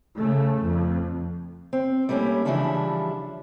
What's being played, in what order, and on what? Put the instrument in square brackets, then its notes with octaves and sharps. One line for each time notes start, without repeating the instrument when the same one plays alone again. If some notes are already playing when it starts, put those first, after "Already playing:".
[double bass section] C#3 A3
F2
[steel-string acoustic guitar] C4
G3 A3 A#3 C#4 E4
C#3 E3 F3 G3 D4 E4